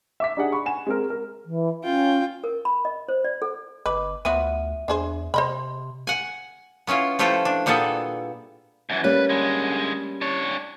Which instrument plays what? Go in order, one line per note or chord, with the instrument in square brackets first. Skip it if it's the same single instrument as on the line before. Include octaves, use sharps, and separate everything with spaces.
[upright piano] E5 D6 B6
D4 D#4 G4 G#4 D5 F#5
B5 C#6
F#5 G#5 E7
G#3 C4 A#4
A#4
[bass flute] E3
[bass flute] C#4 [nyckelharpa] F4 G5
[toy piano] A#4
B5
D#5
C5
D5
A4
[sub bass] G1 [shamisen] B4 [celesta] D#5 D6
[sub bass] D2 [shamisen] F3 B3 F#4 [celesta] E5 D#7
[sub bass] E2 [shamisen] D4 G#4 C5
[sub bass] C3 [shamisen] C5 D#5 B5 [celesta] C6
[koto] F#5 G#5
B3 C#4 E4 F4
F3 A3 E4 F4 G4 A4
D4
A#2 G3 B3 G#4 A4
[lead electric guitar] F#2 E3
[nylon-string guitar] G3 A#3 C#4 [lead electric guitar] B4
[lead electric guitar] D3 G#3
D4 C#5